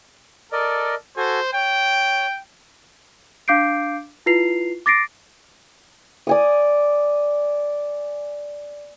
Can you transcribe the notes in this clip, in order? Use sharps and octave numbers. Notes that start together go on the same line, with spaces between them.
A4 A#4 D5 D#5
F#4 A4 C5 G#5
C#5 G5
D4 F5 D6 G6 C7 D7
E4 F4 B4 C7 F7
D6 A6 A#6 C7 D7
D5 G#5 D#6